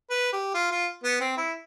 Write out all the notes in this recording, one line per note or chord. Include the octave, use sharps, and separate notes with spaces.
B4
G4
F4
F4
B3
C4
E4